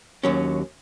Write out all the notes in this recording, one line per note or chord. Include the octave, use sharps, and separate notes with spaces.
D#2 F#3 C#4